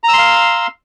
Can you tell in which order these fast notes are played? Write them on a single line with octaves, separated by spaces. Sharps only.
A#5 E6 C6 F5